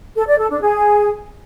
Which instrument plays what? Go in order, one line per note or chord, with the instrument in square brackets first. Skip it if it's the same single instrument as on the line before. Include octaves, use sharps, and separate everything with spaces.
[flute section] A4
D5
A4
D4
G#4